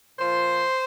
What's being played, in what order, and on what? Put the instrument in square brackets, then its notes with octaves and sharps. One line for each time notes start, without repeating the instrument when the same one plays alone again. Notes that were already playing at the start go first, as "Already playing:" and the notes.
[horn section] A#2 F3 C5